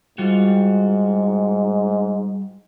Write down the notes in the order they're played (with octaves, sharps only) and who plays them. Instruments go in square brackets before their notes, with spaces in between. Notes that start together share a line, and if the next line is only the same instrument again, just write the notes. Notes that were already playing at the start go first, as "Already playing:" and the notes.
[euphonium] G#2 [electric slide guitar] G3 F4 F#4